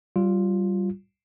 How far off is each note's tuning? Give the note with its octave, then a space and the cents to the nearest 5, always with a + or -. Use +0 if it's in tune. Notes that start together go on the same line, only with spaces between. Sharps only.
G3 -25 F4 +0